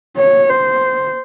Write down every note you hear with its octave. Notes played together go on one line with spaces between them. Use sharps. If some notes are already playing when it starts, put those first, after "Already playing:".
C#5
C5